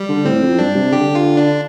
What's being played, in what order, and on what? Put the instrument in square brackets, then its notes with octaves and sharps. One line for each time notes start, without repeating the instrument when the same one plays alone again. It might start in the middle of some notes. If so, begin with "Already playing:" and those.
Already playing: [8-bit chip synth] G3
[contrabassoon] D3
[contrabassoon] A2 [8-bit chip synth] C4
[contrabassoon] F2
[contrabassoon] G2 [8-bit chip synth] D4
[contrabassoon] C3
[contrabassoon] D3 [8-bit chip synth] G4
[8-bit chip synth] F4
D4